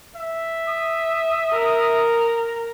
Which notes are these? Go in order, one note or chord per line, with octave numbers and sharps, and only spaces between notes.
E5
D#6
A#4